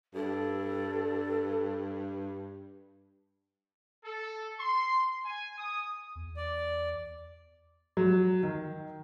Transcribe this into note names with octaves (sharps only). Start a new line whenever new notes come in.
G2 A4
A4
C6
G#5
D#6
E2
D5
F#3
D#3